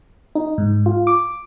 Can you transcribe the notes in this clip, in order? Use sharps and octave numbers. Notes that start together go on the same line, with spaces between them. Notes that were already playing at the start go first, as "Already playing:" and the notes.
D#4
G#2
F4
D6